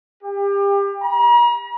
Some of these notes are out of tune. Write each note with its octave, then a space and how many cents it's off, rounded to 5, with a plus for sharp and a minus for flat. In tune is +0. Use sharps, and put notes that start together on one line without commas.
G4 +30
A#5 +45